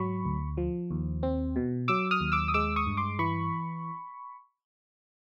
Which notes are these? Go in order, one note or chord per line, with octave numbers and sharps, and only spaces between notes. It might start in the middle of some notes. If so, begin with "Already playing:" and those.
Already playing: G#2 F#3 B5 C#6
D2
F3
D#2
C4
B2
F#3 D6 E6
D#6 F6
D#2
D6 E6
D#6
G#3 D6 E6
C#6 D#6
G2
C6 D6
E3 B5 C#6